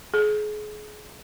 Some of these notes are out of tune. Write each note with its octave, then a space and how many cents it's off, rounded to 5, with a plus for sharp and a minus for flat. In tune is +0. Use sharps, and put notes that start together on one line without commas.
G#4 +30